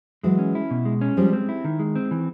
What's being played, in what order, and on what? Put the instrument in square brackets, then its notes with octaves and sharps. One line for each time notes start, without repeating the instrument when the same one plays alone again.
[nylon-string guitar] E3 F#3 [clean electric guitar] G#3
[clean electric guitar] C#4
E4
B2
G#3
C#4
[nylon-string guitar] F3 G3 [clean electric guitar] G#3
[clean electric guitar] C4
E4
D#3
G#3
C4
E3